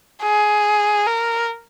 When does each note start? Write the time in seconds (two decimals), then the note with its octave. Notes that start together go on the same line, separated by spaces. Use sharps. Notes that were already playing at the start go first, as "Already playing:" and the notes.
0.24 G#4
1.07 A#4